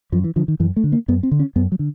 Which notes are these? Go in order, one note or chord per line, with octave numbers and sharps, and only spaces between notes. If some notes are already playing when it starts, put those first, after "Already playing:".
F#2 F3
E3
D3 F3
D#3
F#2 E3
A3
D3
A#3
F#2 B3
C4
D3
C#4
F#2 B3
F#3
D3